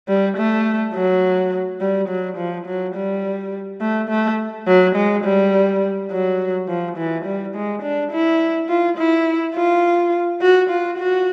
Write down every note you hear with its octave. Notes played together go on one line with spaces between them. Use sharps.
G3
A3
F#3
G3
F#3
F3
F#3
G3
A3
A3
F#3
G#3
G3
F#3
F3
E3
G3
G#3
D4
E4
F4
E4
F4
F#4
F4
F#4